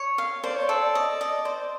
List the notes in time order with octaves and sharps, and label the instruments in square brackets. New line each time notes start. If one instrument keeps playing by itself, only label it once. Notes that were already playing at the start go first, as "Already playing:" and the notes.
Already playing: [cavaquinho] C#5
F5
[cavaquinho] C5 [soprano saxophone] D5
[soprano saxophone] C#5
[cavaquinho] A4 [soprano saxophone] D5
[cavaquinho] D#5
D#5
C5